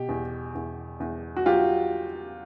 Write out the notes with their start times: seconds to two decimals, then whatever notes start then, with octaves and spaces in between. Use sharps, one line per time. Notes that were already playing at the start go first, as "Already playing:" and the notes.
Already playing: B2 G4
0.09 E2
0.55 E2
1.00 E2
1.37 F#4
1.46 F#3 F4 G4